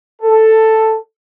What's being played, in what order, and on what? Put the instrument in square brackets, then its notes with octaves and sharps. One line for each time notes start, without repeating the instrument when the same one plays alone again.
[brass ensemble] A4